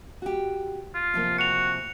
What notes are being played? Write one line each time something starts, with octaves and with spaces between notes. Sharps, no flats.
F#4 G4
F4
C3 F3 A#3
F#4 C#7 F7